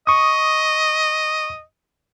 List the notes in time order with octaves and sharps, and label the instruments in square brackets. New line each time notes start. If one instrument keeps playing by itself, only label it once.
[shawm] D#5 [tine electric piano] C#6 D#6